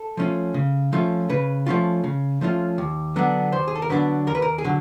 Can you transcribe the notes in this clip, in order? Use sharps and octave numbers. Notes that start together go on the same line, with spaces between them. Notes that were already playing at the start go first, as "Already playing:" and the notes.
Already playing: A4
F3 A3 C#4 F4
C#3
F3 A3 C#4 F4
C#3 B4
F3 A3 C#4 F4
C#3
F3 A3 C#4 F4
D#2
D3 F#3 B3 D4
D#2 C5
G#4
A4
A#4
D3 F#3 B3 D4 B4
D#2 A#4
B4
A#4
G#4
D3 F#3